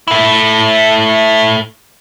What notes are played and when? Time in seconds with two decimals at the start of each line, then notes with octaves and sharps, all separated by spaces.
0.08 A3 E4